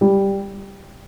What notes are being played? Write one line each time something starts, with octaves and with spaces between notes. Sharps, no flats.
G3